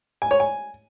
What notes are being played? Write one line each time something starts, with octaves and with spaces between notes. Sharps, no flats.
G#5
C#5
G#5